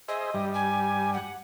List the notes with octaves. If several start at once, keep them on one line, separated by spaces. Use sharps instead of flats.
G#4 C5 D#5 E5
G2 G3
G#5
F#5